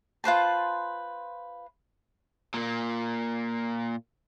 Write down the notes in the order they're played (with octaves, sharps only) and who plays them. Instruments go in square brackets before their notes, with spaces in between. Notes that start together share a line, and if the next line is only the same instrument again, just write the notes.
[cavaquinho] F4 B4 C5 A5
[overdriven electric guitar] A#2 A#3